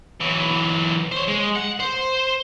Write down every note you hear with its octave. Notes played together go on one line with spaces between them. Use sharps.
E3 F#3
C5 C#5
G#3
F#5
C5